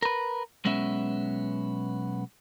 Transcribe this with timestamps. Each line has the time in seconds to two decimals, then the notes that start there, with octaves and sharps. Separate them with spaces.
0.02 A#4 B4
0.65 B1 G#3 B3 C#4 E5